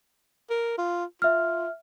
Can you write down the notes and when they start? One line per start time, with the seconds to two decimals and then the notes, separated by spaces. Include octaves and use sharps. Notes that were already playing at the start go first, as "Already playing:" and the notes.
0.50 A#4
0.78 F4
1.22 F4 E5 F6